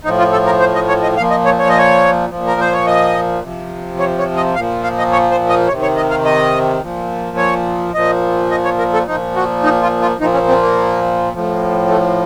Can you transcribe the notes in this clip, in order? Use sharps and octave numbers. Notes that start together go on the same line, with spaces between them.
A2 F3 D#4
F4
A4
A#4
C5
D#5
C#5
D#5
A#2 F3 F5
D#5
C#5
C#5
D#5
C#5
A#2 F3
A#4
C5
C#5
D#5
C3 F3
C#5
C#5
D#5
A#2 F3 F5
F5
D#5
C#5
C5
D#5
C3 C#5
D#3
C#5
D#5
F5
D#5
A#2 F3
C#5
A#2 F3 D#5
D#5
C#5
A#4
A4
A#2 F3 D#4
F#4
D#4
F4
F4
A#2 F3 D#4
C#4
C4
A#3
A2 F3
A3